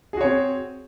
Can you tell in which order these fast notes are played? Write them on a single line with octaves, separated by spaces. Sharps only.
G#4 F#4 C#5 C4